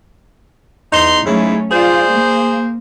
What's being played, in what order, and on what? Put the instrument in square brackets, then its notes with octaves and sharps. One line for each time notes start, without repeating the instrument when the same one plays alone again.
[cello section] E2 [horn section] D#4 C6
[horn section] G#2 C#3 E4 [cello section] F#3 A3 C#4
[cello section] F4 D5 F5 [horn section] G#4 C5
[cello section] A#3